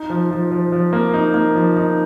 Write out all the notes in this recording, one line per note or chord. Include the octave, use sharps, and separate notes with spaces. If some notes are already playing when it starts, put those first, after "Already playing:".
Already playing: D#4
F3
F3
F3
F3
A#3
D#4
A#3
F3
D#4